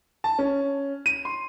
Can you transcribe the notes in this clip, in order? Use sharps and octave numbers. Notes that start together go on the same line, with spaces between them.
A5
C#4
D#7
C6